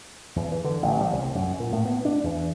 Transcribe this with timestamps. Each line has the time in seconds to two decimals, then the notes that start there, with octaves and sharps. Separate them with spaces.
0.36 E2
0.52 E3
0.64 D3
0.82 A1
1.01 G3
1.13 C2
1.35 F#2
1.60 A#2
1.72 A2
1.85 B3
2.05 D4
2.24 E2